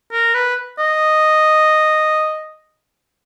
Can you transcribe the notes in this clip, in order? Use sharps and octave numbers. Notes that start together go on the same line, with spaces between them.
A#4
B4
D#5